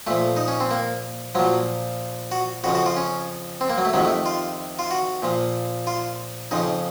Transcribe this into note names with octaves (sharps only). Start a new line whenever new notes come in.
A#2 F3 A3
D#4
C#4
C4
A#3
A#2 F3 F#3
F#4
F2 C#3 F3 F#4
F#4
F4
C#4
C4
A#3
F#3
A3
F2 C3 D#3 F#3
A3
F4
F4
F#4
A#2 F3
F4
F2 C#3 F3 D#4